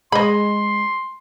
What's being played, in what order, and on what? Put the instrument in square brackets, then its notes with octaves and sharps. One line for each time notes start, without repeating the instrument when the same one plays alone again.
[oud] G#3 [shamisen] D#5 B5 [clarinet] C6